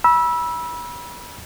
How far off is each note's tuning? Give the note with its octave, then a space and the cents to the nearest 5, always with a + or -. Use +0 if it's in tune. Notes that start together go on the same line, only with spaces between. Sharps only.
B5 -30 E6 +0